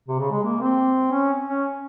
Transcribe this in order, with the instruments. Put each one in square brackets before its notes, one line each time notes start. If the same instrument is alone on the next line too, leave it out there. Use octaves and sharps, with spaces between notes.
[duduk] C3
C#3
G#3
A#3
C4
C#4
C#4